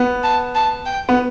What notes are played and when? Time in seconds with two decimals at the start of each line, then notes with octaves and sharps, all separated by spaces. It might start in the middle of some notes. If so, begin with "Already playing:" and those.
Already playing: B3
0.24 A5
0.55 A5
0.86 G5
1.09 B3